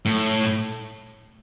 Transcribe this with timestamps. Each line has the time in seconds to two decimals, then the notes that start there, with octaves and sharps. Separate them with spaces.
0.05 A2